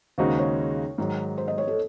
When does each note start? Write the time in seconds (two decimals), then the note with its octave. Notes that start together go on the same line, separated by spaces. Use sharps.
0.18 D#2 C#3 G#3 D#4 F#4 C5
0.39 C#5
0.98 G#2 D#3 F#3
1.38 C5
1.48 D#5
1.58 C#5
1.68 A4